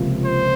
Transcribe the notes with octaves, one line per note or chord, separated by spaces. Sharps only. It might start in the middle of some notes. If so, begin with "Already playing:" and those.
Already playing: C#2 C3 F3 A#3
C5